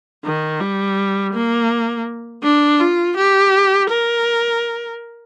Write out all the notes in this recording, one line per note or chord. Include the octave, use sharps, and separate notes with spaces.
D#3
G3
A#3
D4
F4
G4
A#4